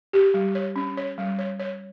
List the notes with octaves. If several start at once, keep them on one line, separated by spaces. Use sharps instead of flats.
G4
G3
C#5
C#4
C#5
G3
C#5
C#5